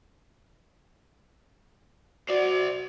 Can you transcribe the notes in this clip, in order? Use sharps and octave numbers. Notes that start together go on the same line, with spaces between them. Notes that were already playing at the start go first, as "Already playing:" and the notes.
F#4 C5 D5